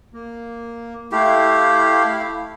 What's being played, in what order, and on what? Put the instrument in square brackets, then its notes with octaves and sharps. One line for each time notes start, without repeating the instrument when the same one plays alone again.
[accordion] A#3
[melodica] A3 G4 [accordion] E4 F5